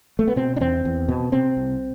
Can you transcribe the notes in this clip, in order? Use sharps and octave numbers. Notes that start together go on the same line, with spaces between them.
A3
B3
B2 C4
D4
E2 C4
E2
B2
C3 C4
C2